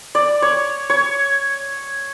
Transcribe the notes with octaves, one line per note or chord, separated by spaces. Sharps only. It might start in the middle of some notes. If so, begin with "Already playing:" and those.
D5
C#5
C#5